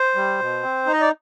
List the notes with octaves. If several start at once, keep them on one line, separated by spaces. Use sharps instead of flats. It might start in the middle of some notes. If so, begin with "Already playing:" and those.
Already playing: C5
G3
B2
C4
D#4
D#5
D5